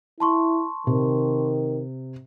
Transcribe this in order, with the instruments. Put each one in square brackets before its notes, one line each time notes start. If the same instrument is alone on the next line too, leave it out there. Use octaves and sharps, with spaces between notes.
[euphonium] E4 [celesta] A5 C6 C#6
[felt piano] C3 [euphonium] D#3